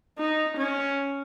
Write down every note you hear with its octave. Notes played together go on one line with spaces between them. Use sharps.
D#4
C#4